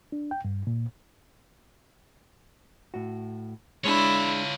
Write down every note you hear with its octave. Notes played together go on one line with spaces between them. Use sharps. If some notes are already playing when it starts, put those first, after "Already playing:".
D4
G5
G2
A#2
A2 F#4
G#3 D4 E4 F4 C#5